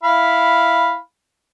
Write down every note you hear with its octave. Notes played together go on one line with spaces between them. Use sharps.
E4 F5 B5